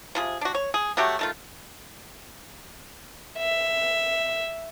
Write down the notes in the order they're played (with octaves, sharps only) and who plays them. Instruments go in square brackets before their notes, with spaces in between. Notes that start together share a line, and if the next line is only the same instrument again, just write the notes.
[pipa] C3 F3 G#4
D4 F#4
C#5
G#4
F#3 A3 F#4 G4
D#3 A3 F4
[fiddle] E5